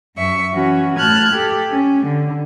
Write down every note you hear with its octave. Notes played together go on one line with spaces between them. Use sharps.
F#2 E5 C#6
E3 C#4 F#4
A2 A5 F6 F#6 G#6
G4 A4
C#4
D3